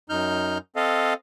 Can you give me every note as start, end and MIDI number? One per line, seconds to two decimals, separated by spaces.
0.10 0.58 42
0.10 0.58 63
0.10 0.58 89
0.10 0.58 91
0.76 1.14 60
0.76 1.14 69
0.76 1.14 75
0.76 1.14 77